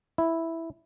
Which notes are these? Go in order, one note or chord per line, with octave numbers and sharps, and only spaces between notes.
E4